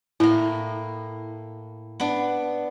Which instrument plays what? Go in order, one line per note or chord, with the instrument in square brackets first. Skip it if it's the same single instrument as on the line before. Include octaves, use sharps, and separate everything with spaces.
[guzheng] A2 A#3 [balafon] E4
[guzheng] B3 D4